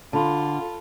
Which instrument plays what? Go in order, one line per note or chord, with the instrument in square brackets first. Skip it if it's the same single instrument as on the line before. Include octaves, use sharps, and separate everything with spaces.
[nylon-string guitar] D3 [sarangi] F4 [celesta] A5 B5 C6